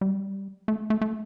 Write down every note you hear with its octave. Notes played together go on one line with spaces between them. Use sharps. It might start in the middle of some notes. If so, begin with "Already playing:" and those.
G3
A3
A3
A3